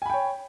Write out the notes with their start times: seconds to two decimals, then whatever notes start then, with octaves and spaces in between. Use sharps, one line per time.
0.02 G#5
0.06 B5
0.10 G5
0.14 C#5